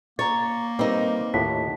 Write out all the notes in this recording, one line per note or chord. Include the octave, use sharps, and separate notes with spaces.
A#3 C#5 A#5 C#6 A6
G3 C4 D#4 A#4 B4
D#2 A2 F4 F#5 A5 B6